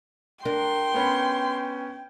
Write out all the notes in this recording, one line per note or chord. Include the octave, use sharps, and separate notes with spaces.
D4 A#4 G5 C6
B3 C#4 B5